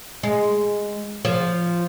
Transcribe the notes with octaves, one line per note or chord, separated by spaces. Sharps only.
G#3
F3